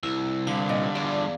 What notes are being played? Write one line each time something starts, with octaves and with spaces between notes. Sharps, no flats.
C2 E4
G2 D3 F5
A#2 D#5
E2 D5